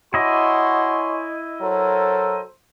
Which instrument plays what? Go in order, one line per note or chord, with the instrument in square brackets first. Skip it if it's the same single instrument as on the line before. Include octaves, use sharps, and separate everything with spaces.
[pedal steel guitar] E4 D#5 [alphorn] F#4 [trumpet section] C#5 G#5 C6
[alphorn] F#3 [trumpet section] A4 A#4 C5